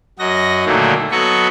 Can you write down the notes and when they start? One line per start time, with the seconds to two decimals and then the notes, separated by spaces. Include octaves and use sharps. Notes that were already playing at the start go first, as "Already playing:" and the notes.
0.19 F#2 F#4 D#5 A#6
0.66 A#2 D3 D#3 F#3 A3 A#3
1.11 F#3 B3 A4 D#5 B5 C#6